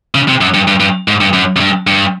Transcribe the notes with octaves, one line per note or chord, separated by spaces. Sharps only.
C#3
C3
F#2
G2
G2
G2
G#2
G2
F#2
F#2
G2
G2